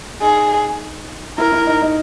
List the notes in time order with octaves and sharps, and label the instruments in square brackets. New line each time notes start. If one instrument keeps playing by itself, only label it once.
[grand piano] D#4 [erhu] G#4
[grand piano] E4 [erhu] A#4
[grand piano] E4
D#4
D#4